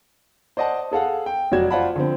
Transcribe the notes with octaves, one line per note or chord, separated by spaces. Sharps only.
C5 D5 D#5 F#5 A5
G#4 A4 F5 F#5
G5
F1 F#3 F#4 D5 G#6 E7
F4 C5 D5 F#5 A5 B5
D3 F3 C4